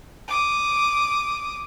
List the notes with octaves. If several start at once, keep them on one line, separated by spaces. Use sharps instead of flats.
D6 D#6